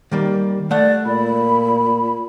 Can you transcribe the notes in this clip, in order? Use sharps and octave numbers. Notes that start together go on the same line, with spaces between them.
D#3 G3 A#3
A3 D5 F#5
A#2 B5